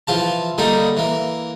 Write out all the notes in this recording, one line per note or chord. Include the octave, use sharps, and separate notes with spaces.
E3 F3 F4 A5
D3 G3 A#3 D#4
E3 A#3